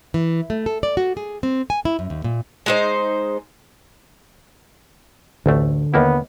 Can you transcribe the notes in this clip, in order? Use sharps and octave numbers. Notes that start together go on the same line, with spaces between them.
E3
A3
A4
D5
F#4
G#4
C4
G#5
E4
F#2
D#2
A#2
G#3 D#4 C5
A1 D2 D3 A3
D#2 A#3 B3 E4